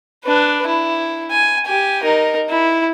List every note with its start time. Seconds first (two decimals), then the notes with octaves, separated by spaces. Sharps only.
0.24 D4 B4
0.66 E4
1.31 G#5
1.66 G4 G#5
2.03 D#4 A#4
2.49 E4